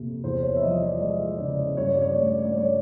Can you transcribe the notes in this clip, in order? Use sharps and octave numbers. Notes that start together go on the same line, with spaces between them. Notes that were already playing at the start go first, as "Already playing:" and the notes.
Already playing: F2 C3 A#3
E2 C5
C#5
E5
F3 D#5
D5
G#3 D#5
C#3 D5
G2 C#5
D5
C#5
A3 D5
D5
G2 C#5